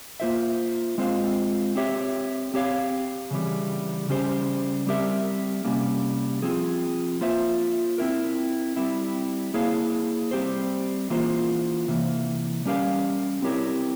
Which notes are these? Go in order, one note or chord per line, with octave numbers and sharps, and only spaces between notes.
A#3 F4 C5 E5
G#3 C4 F4 C5 F5
C4 G4 C#5 E5
C4 G4 C#5 F5
C#3 E3 G3
C#3 G3 C#4 G4 C5
G3 C4 G4 A#4 E5
C3 G3 A#3 C#4
F3 C4 F4 G#4
A#3 F4 C5 E5
C4 E4 A#4
G3 C4 E4
A#3 E4 G#4 C#5 F5
G3 C4 G4 C5
E3 A#3 F4 C5
C3 E3 A#3
G3 C#4 G4 A#4 F5
C4 E4 G4 A#4 C#5